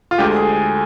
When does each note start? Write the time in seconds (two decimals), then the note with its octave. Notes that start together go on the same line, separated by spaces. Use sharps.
0.11 F4
0.18 D2 D3 G#3 G4
0.36 G#4